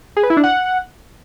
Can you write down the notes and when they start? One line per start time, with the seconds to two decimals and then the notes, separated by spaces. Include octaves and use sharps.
0.17 G#4
0.23 B4
0.30 E4
0.37 D4
0.44 F#5